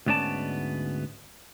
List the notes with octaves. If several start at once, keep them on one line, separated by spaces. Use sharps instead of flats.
D2 G#2 B3 C#4 D5 A5